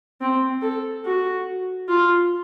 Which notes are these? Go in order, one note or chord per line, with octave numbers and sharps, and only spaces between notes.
C4
A4
F#4
F4